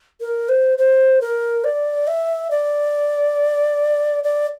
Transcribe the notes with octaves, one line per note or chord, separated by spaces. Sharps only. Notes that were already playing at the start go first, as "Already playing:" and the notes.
A#4
C5
C5
A#4
D5
E5
D5
D5